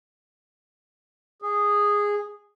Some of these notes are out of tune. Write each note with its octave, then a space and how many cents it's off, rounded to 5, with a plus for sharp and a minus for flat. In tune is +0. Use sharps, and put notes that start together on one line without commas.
G#4 -10